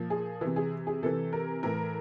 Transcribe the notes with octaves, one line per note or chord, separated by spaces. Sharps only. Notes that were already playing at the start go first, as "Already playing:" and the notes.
Already playing: A#2 F3
G#4
C3 E3
G#4
G#4
C3 E3 A4
A#4
A2 E3 A#4